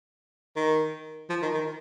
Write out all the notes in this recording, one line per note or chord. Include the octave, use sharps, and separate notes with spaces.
D#3
F3
D#3
D#3